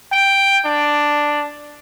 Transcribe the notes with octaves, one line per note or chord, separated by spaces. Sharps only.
G5
D4